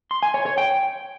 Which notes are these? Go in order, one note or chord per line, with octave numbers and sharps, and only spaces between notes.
C6
G#5
C#5
C#5
G5